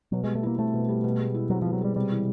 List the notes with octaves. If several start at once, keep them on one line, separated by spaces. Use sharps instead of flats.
B2 F#3
G#3
G3
A3
A#3 E4
A3 C4
B2
G3
B2
G#3
E4
F#3 C4
F3
B2
F#3
G3 G#3
C3 G3
E3